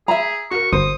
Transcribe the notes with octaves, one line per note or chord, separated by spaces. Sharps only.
G#4 E5 A#5
F#4 A#4 C#6
G1 C5 D#6